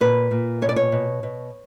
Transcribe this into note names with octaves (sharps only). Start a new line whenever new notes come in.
A#2 B4
A#2
B2 C#5
D5
C#5
B2
B2